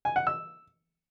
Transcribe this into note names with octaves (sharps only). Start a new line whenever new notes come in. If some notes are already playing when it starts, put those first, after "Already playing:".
G#5
F#5
E6